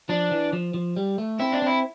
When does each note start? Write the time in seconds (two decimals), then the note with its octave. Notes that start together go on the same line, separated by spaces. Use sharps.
0.09 F3 D4
0.31 E3
0.53 F3
0.74 F3
0.96 G3
1.18 A3
1.39 C4 E4
1.53 D4
1.62 C4 E4